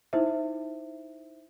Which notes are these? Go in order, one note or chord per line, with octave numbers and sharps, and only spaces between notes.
D#4 E4 C5 E5